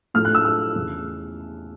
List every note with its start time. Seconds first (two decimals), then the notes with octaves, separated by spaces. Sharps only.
0.14 A2 F3 A3 F6
0.25 F#6
0.35 E6
0.45 E6
0.75 E2 C#3 E3